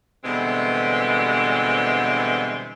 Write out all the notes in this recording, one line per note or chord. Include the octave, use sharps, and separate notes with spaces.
B2 D3 E3 G3 G#3 C4